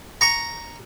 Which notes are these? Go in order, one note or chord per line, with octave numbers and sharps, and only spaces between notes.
A#5 C#6